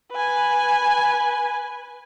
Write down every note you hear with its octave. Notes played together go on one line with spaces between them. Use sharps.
B4 G#5